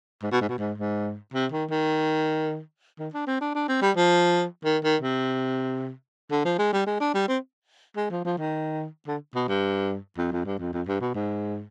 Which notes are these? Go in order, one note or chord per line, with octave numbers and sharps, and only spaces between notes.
G#2
B2
G#2
B2
G#2
G#2
C3
D#3
D#3
D#3
D4
C4
D4
D4
C4
G3
F3
D#3
D#3
C3
D3
F3
G#3
G3
G#3
D4
G3
C4
G#3
F3
F3
D#3
D3
B2
G2
F2
F2
G2
F2
F2
G2
B2
G#2